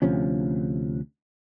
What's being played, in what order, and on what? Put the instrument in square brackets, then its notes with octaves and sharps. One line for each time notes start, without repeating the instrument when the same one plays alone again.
[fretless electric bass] D2 C3 F3 C#4